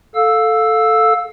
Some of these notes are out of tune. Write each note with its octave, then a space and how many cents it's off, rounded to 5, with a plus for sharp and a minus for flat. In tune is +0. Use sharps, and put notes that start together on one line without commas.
A4 +0 F5 +15 E6 +0